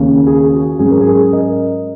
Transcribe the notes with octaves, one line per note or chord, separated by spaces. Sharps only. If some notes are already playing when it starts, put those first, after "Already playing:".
Already playing: D#2 C#3 A#3 C#4
G#4
F#4
G#2 F#3 C#4 G#4
A#4
G#4
A#4 D#5